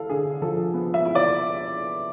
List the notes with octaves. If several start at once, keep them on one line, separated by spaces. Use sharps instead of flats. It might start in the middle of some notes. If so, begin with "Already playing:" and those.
Already playing: E4 A4 F5
D3 G#4
F3 A4
B3
E5
E4
D5